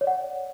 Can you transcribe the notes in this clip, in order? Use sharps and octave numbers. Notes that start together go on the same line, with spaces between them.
C#5 D5 F#5